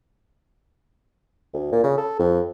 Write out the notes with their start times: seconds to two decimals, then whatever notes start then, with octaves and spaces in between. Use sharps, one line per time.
1.54 D2
1.72 A#2
1.84 C#3
1.98 A4
2.19 F2